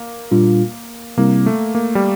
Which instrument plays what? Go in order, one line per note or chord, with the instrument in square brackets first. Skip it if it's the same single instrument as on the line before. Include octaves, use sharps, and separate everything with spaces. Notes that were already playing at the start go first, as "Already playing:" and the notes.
Already playing: [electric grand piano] A#3
[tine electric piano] A#2 G3 D4 F4
[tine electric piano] C3 G3 C4 E4 A#4 [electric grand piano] A#3
[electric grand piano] A3
A#3
G3